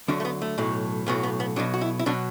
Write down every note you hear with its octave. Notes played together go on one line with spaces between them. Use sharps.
D2 D3 F#3 D4
A3
B3
A3
B1 A2 F#3
B1 A2 F#3 B3
B3
B3
B1 B2 F#3 D4
F#4
E4
E4
B2 F#3 D4